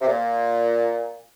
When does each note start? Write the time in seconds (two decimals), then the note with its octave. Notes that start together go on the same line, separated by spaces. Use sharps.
0.02 C3
0.07 A#2